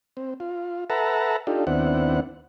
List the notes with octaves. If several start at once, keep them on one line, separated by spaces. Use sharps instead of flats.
C4
F4
A4 B4 E5 F#5 A5 A#5
D4 D#4 F4 G4 A4
D#2 B3 C4 D4 E4 F#5